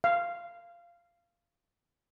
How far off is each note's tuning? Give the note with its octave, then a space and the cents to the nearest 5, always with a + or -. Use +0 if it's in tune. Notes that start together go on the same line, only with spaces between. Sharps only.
F5 -15